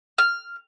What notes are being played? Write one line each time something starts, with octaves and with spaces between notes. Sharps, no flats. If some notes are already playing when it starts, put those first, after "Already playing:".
F6